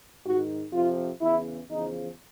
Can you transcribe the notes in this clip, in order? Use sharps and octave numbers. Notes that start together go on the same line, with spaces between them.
G#2 D#3 F#4
F2 C3 F3 F4
E2 C#3 E3 E4
E2 C#3 F3 D#4